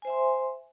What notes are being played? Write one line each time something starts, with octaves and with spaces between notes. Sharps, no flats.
C5 E5 G#5 C6